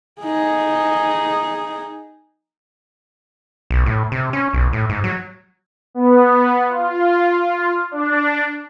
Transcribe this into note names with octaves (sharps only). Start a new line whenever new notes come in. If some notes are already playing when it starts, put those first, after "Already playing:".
D#4 G#4
B1
A2
C3
C#4
B1
A2
G#2
F#3
B3
F4
D4